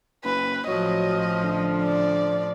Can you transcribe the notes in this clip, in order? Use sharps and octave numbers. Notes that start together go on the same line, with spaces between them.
F#1 B4
A1 F3 F#3 D#5
D3
D5